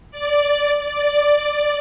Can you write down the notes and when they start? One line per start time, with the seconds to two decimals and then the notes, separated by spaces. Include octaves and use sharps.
0.11 D5
0.85 D5